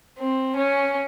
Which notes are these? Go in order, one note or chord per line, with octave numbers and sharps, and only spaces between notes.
C4
C#4